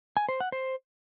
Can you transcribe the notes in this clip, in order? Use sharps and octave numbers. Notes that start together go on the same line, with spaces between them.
G#5
C5
F#5
C5